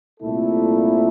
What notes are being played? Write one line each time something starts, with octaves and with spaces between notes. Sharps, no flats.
C2 A#2 A3 E4 A4